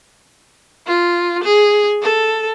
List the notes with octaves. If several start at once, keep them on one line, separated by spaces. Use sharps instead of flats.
F4
G#4
A4